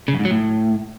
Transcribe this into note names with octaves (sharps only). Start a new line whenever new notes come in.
C#3
F#2
G#2
F#3
A2